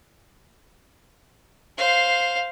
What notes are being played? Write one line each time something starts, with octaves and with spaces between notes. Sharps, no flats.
C5 F5